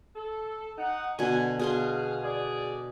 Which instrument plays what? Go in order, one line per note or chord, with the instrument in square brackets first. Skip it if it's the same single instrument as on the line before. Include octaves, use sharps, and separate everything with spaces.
[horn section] A4
D#4 F#5
[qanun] B2 D3 [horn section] G#5
[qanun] B2 G#5 C6 [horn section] G#4 F5
[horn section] G#4 D5